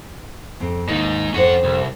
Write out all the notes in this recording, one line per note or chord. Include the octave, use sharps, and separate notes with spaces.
F2 C4
D#2 G#3 D#4
F2 C#4 C5 F#5
C2